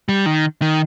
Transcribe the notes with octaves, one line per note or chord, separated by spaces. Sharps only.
G3
D#3
D#3